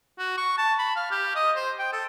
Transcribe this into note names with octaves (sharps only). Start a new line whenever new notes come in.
F#4
C#6
A5
B5
F5
G4
D#5
C5
G5
A4